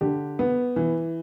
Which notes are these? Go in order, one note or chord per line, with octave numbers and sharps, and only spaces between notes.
D3 G4
B3
E3